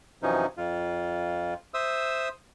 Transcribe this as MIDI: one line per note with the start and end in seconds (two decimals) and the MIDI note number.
0.22 0.46 42
0.22 0.46 48
0.22 0.46 52
0.22 0.46 53
0.22 0.46 61
0.22 0.46 63
0.57 1.54 41
0.57 1.54 65
1.74 2.29 72
1.74 2.29 76
1.74 2.29 87
1.74 2.29 88